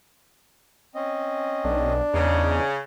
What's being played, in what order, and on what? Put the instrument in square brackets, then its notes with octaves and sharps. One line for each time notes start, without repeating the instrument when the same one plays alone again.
[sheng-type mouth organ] C4 C#4 D#5
[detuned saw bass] B1 [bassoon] D4
[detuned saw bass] E2 [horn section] C#3 [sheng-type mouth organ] D#4